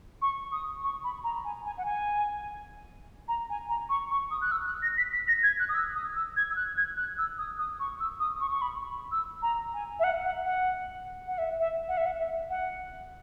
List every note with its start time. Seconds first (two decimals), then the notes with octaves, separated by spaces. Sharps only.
0.22 C#6
0.52 D#6
0.84 C#6
1.04 B5
1.24 A#5
1.45 G#5
1.65 G#5
1.78 F#5
1.85 G#5
3.28 A#5
3.50 G#5
3.69 A#5
3.90 C#6
4.11 C#6
4.31 D#6
4.42 F#6
4.52 E6
4.67 F#6
4.83 A#6
4.98 B6
5.12 B6
5.28 A#6
5.43 G#6
5.60 F#6
5.69 D#6
5.74 E6
5.95 D#6
6.16 E6
6.37 G#6
6.50 E6
6.56 F#6
6.77 G#6
6.97 F#6
7.18 E6
7.38 D#6
7.58 D#6
7.80 C#6
8.00 E6
8.20 D#6
8.41 C#6
8.52 C#6
8.62 B5
9.12 E6
9.42 A#5
9.74 G#5
10.00 E5
10.04 F#5
10.25 F#5
10.45 F#5
11.28 F#5
11.38 E5
11.60 E5
11.88 F#5
11.97 E5
12.06 F#5
12.19 E5
12.50 F#5